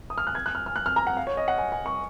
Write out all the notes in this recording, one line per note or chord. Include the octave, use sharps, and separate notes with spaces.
D#6
F6
F#6
G#6
F#6
F6
F6
F#6
F6
A#5
F#5
F5
C#5
D#5
F#5
G#5
G#5
C#6